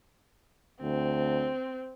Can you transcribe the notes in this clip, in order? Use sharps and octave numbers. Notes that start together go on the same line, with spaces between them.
D2 C4